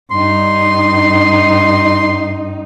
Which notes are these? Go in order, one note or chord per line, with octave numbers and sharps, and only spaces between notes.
G2 D#4 C6